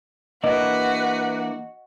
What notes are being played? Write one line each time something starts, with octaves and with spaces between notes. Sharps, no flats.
E3 A#3 D4 F#4 B4 D#5